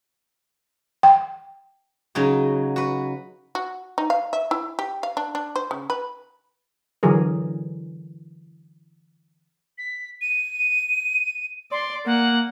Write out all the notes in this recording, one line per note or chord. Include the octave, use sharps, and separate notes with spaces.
G5
C#3 F#3 D#4 F#4
F#4 B4
F#4
D#4
F5
E5
E4
G4
F5
D4
D4
C5
C#3
B4
D3 E3 F#3 G#4 A#4
B6
D#7
D5 C6
A#3 F#5